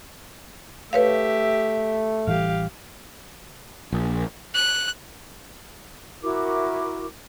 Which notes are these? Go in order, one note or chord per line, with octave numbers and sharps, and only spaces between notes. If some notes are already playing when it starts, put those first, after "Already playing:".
A3 G4 B4 C#5 E5 F5
A1 E3 G3 G4 F5
A#1
F#6
E4 F#4 A#4 D6